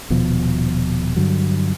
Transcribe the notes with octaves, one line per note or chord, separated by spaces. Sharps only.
D#1 B2 F3
G2 D3 F#3